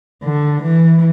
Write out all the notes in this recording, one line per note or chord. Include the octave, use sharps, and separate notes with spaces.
D3
E3